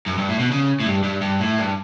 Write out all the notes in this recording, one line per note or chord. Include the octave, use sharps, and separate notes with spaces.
F#2
G2
A2
B2
C#3
A2
G2
G2
G2
A2
G2